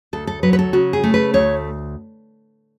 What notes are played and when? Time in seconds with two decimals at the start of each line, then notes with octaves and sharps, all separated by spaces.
0.13 D2 A4
0.27 A4
0.43 F#3 B4
0.53 B4
0.59 A4
0.73 C#3 F#4
0.93 G#4
1.04 A3
1.14 B4
1.34 D2 C#5